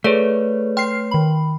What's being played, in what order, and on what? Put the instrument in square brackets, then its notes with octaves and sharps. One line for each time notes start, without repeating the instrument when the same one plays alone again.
[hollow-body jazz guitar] A3 [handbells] G#4 A4 D5 [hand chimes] B4 C#5
[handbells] G5 C6 [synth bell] F6 C7
[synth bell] D#3 B5